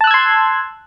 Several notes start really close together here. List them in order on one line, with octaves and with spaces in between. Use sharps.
A5 F#6 E6 G#6 C6